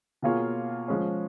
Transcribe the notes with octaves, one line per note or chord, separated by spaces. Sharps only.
B2 A#3 F4 G#4 C#5
F3 G#3 C#4